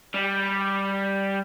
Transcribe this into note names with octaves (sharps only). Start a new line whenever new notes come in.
G3